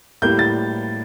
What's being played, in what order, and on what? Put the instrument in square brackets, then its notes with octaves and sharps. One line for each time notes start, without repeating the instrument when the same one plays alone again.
[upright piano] A2 G3 A#3 [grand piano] G6
[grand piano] A6